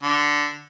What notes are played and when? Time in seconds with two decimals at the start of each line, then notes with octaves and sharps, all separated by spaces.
0.03 D3